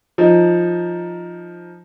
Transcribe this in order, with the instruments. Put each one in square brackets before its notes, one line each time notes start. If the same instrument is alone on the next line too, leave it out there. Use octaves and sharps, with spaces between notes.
[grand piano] F3 D#4